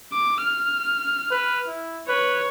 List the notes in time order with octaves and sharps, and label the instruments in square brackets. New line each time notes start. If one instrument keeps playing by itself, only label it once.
[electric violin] D6
F6
[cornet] B4
E4
[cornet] B4 [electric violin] C#5